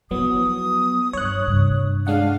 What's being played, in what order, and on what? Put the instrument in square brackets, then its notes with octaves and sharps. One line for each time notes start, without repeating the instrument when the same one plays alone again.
[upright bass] F3 E4 [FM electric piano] F#3 B3 [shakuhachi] D#6
[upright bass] G2 [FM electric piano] C#5 F#6
[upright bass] G2 C3
[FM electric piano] G#3 D4 F#5 [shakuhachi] F5